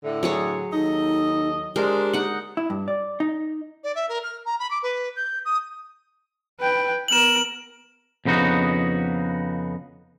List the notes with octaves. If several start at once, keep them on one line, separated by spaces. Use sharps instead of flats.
A2 D3
F#3 G#4 C#5
D#2 D#4 A4 D#5
G#3 D4 G4 A#4 C5
D#4 F#5
E4
G2
D5
D#4
D5
E5
A#4
F6
A#5
B5
D6
B4
G6
D#6
B4 G5
B3 A#4 E7 F#7
F2 C#3 B3 D#4 F#4